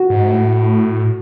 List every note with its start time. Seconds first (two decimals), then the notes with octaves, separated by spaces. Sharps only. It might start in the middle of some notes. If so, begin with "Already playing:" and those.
Already playing: F#4
0.10 G#2
0.28 A2